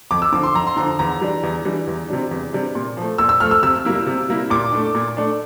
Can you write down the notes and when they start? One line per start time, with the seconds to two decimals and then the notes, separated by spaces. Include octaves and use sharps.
0.11 F2 D6
0.22 E6
0.32 D3 F3 D6
0.43 C6
0.54 F2 A#5
0.67 C6
0.76 D3 F3 A#5
0.99 E2 A#5
1.21 E3 G3 D4
1.43 E2
1.65 E3 G3 D4
1.87 E2
2.09 C3 G3 D4
2.31 E2
2.53 C3 G3 D4
2.75 A#2
2.97 F3 A3
3.18 A#2 E6
3.29 E6
3.40 F3 A3 F6
3.51 E6
3.62 C3 E6
3.85 G3 A#3 E4
4.06 C3
4.29 G3 A#3 E4
4.50 A#2 D6
4.72 A3 D4
4.95 A#2
5.17 A3 D4